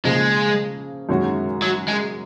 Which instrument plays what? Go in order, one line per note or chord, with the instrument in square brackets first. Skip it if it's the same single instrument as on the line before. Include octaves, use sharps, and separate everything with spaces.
[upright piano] C#3 F3 A#3 [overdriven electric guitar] G#3
[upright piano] F#2 D#3 G#3 C#4 F#4
[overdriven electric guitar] F#3
G#3